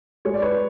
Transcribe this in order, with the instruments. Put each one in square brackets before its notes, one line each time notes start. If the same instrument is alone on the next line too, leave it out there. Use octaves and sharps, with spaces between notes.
[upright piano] G#3 C#5
D5
B4 C#5